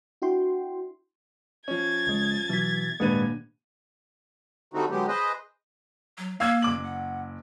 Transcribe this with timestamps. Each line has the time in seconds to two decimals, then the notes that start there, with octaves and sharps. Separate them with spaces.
0.22 D4 E4 F#4 G5 C6
1.68 F3 C#4 G#6 A6
2.07 C#2 G#3
2.49 B2 E3 F#3 B6
3.00 D#1 G#1 G#3 A#3 D4 B4 D#7
4.74 D3 G3 A3 C4 D#4 F#4
4.90 D3 F#3 G#3 B3 G4
5.08 G#4 B4 C5 D#5
6.18 F#3
6.40 A#3 F5 E6 G#6
6.62 F#1 D6 F#7
6.85 F#5